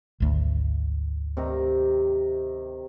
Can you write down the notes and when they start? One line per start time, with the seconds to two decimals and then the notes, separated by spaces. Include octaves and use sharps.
0.20 G#1 D2
1.37 C3 D#3 A#5